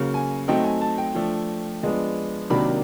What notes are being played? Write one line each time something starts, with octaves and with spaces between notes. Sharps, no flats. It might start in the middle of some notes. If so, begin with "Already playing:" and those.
Already playing: C#3 F#3 A#3
G#5
F#3 A3 C4 D#4 G5
G#5
A5
G5
F3 A3 D4
F3 G#3 B3 D4
C3 D#3 F#3 A#3 D4 B5